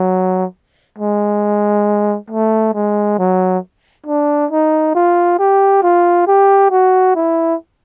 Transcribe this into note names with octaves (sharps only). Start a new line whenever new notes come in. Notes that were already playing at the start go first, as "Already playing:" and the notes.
Already playing: F#3
G#3
A3
G#3
F#3
D4
D#4
F4
G4
F4
G4
F#4
E4